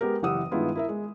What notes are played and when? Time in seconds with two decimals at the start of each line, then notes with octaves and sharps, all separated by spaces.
0.01 G#3 B3 G4 A#4
0.22 F#1 E3 G4 F#5 D#6 E6
0.51 G2 D#3 G#3 B3 E4 F4
0.75 E4 A#4 E5
0.89 G#3